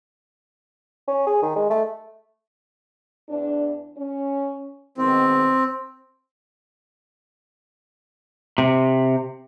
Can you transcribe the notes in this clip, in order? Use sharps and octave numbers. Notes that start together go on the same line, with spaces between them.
C#4
G#4
D#3
G#3
A3
E2 D4
C#4
G#2 B2 D#3 C4
C3